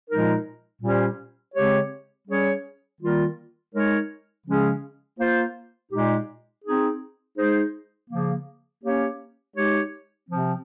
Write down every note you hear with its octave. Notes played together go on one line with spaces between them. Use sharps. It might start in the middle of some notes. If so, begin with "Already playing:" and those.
A#2 F3 G#3 D#4 A#4
A#2 G3 C#4 G4 C5
C#3 G#3 C4 G4 C#5
G3 C#4 G#4 C#5
D#3 G3 A#3 F4 A#4
G#3 D#4 A#4 C#5
C#3 F3 G#3 C#4 G#4
A#3 F4 C5
A#2 G#3 D#4 G4
C4 D#4 G#4
G#3 D#4 G#4 C5
C#3 F3 A#3
A#3 C#4 G4 C#5
G#3 D#4 G4 C#5
C3 F3 C4